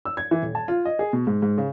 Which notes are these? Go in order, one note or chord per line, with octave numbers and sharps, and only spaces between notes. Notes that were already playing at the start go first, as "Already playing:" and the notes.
E6
G#6
E3
D#1
A5
F4
D#5
G#4
B2
G#2
G#2
C#3